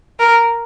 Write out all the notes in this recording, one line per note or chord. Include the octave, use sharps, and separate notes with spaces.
A#4